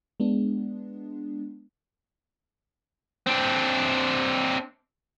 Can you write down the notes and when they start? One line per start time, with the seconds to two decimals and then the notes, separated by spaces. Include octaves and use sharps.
0.20 G#3 B3 D4
3.27 C4 D4